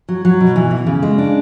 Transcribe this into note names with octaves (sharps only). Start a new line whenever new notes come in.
F#3
F#3
B2
E3
E3
C#3
G#3
D4